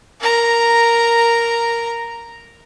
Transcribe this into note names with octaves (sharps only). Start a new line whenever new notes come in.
A#4 A#5